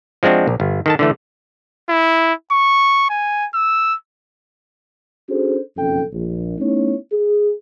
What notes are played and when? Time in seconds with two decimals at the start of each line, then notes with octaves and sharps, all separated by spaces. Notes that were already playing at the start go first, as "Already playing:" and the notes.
0.23 F3 G#3 C4 D4 F#4
0.48 A#1
0.60 G1
0.86 D#3 A4 A5
0.99 D3 E3 A3
1.89 E4
2.52 C#6
3.10 G#5
3.54 E6
5.29 C#4 D4 F#4 G#4 A4 C5
5.76 F#1 B1 F2 C#4 A4 G5
6.13 A#1
6.59 A3 B3 C#4 D#4 E4 C#5
7.12 G#4